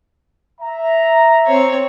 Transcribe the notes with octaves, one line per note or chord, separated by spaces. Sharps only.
E5 A#5
C4 C#5